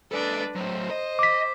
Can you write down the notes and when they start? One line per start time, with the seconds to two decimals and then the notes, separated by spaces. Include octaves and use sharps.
0.12 G#3 D4 A4 B4 D5
0.56 A2 F#3 C5
0.91 D#5
1.19 D6 B6